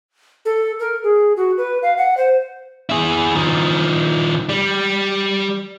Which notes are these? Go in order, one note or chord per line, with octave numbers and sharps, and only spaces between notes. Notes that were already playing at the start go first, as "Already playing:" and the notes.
A4
A#4
G#4
F#4
B4
F5
F#5
C5
E4 G#4
D#3 F3
G3